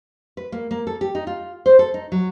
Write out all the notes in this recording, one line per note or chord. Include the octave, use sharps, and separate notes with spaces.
B4
A#3
A#3
A4
G4
D#4
F4
C5
A4
D#4
F#3